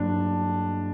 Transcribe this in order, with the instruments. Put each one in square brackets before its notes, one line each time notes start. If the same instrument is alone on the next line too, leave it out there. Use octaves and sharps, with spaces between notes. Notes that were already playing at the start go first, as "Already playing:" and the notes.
Already playing: [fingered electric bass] G2 F#3 A#3 [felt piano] D4